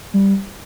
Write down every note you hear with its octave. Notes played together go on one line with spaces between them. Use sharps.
G3